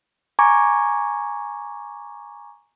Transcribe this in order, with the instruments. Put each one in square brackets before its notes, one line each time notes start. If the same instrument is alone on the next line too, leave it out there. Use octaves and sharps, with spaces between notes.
[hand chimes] G#5 A#5 C#6 D6 G#6